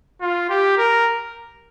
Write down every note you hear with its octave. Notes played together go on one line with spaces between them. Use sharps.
F4
G4
A#4